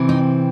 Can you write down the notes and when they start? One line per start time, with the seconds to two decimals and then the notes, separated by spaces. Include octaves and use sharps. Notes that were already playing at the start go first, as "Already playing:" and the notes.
Already playing: C3 E3 C4
0.09 D#4